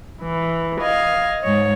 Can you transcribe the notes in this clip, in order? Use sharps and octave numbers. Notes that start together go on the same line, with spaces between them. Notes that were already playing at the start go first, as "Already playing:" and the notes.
E3
D#5 F5 G#6
G#2 C#5